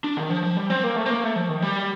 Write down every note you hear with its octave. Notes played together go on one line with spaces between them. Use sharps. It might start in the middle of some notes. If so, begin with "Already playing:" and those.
D4
D#3
F3
F3
G3
C4
A#3
A3
C4
A#3
A3
F3
D#3
G3